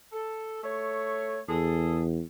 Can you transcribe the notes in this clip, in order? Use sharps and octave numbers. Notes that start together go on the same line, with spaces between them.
A4
A3 C#5
E2 G#4 A4